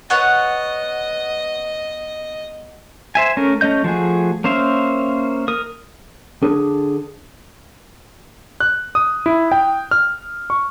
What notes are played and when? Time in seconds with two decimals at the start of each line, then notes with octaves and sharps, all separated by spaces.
0.10 B3 C#5 D#5 F#5
3.15 C5 E5 G#5
3.37 A3 C#4 A#4
3.61 A3 C#4 D#5 G6
3.84 F3 A3 F#4 G#4
4.44 A#3 C#4 C5 E5 F5
5.48 A#4 D#6
6.43 D3 D4 G#4 A4
8.60 F#6
8.95 D#6
9.26 E4
9.52 G5
9.91 F6
10.50 C#6